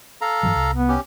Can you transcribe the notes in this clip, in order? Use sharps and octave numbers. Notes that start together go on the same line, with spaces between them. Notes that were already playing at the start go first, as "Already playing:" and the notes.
A4 F5 A#5
G2 E3 F#3
C2
B3
C#4 G4